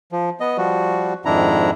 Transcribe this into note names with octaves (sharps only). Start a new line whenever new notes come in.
F3
B3 D#5
F3 G3 F#4
F2 G#2 D#3 D4 E4 A#5